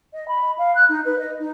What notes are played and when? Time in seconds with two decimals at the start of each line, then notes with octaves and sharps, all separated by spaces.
0.13 D#5
0.28 B5
0.58 F5
0.75 F#6
0.89 D#4
1.05 B4
1.19 D#5
1.40 D#4